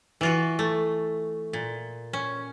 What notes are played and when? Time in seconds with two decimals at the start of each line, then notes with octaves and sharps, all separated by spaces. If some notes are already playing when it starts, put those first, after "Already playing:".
0.21 E3 F4 F#4
0.59 A3
1.53 A#2
2.13 C#4